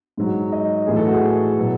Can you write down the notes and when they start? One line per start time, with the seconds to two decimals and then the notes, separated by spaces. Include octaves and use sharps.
0.17 G#2 F#3
0.52 D#5
0.87 A2 E3 G#4
0.96 A4
1.05 F#4
1.13 G#4
1.59 B2 F#3